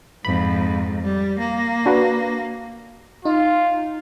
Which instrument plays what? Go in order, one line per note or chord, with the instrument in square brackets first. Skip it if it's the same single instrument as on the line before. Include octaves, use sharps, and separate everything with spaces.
[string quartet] F2 G#2 [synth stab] B5
[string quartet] G3
A#3
[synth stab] D4 F#4 B4
[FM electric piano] D#4 [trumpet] F4